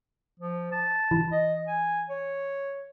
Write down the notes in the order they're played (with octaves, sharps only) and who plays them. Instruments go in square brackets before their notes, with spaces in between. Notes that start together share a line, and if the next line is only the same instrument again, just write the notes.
[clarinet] F3
A5
[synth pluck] E3
[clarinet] D#5
G#5
C#5